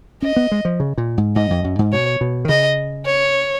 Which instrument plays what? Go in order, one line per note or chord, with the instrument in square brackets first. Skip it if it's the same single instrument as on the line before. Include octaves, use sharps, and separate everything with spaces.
[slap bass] C#4 [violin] D#5
[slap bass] B3
G#3
F3
C#3
A#2
G#2
[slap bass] G#2 [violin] D#5
[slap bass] F2
F#2
G#2
[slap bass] B2 [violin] C#5
[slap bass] B2
D#3
[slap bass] C#3 [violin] D#5
[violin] C#5